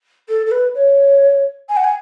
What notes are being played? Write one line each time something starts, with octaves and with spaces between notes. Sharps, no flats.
A4
A4
B4
C#5
G#5
F#5
G#5